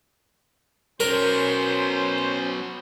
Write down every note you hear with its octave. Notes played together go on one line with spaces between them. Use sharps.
F#3 B3 C#4 A#4 C5